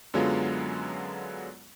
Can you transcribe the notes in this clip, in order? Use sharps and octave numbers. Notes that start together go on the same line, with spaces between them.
F#2 D3 F#3 G#3 B3 F4